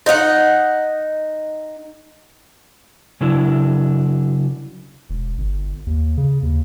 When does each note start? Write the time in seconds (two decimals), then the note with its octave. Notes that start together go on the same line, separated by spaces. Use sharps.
0.06 D#4 D#5 F5 F#5
3.21 C#3 F#3 D4 E4
5.10 E1
5.38 G1
5.87 D#2
6.17 C#3
6.43 D#2